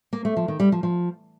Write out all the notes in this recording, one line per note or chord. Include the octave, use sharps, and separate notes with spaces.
A#3
A3
F3
D#3
G3
F3
F3